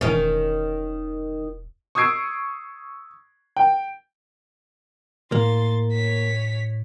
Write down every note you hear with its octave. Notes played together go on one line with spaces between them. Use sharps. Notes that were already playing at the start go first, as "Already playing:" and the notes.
E1 D#3 C#4
C#6 D#6 E6 G#6 C7 D7
G5
A2 A#3 C6 A6
C#5 B6